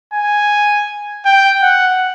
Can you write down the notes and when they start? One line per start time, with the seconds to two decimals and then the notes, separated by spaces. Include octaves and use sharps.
0.14 G#5
1.25 G5
1.62 F#5